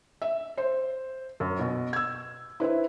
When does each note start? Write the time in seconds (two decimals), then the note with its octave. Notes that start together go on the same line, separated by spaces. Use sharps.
0.22 E5
0.57 C5
1.40 F#2
1.59 B2
1.93 E6 G#6
2.60 E4 B4 C5 E5